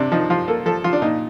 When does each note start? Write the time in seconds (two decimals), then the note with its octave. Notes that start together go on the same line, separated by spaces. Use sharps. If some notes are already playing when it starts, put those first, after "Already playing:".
Already playing: C3 D4
0.12 F3 D#4
0.30 F3 F4
0.48 A#3 A4
0.66 F3 A4
0.84 F3 F4
0.93 D4
1.02 A#2 D#4